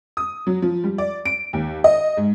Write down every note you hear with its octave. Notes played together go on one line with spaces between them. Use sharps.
D#6
F#3
F3
G3
D5
D7
D#2
D#5
G#2